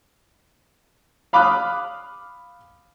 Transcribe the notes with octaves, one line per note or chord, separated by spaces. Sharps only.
F5 B5 D6 D#6 F6 F#6